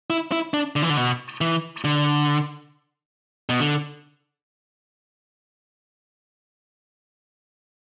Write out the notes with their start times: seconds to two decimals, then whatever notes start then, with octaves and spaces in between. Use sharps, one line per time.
0.10 E4
0.32 E4
0.54 D4
0.76 D3
0.82 E3
0.90 D3
0.97 B2
1.41 E3
1.84 D3
3.49 B2
3.60 D3